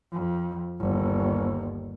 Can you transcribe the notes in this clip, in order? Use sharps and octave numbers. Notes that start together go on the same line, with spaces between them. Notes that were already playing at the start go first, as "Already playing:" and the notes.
F2
G1 D#2